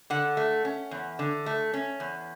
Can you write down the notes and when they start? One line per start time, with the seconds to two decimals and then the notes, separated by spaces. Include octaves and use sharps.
0.10 D3 F#5
0.37 A3
0.65 C#4
0.91 E2
1.19 D3
1.46 A3
1.74 C#4
2.00 E2